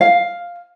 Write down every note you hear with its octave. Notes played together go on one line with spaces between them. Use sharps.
F5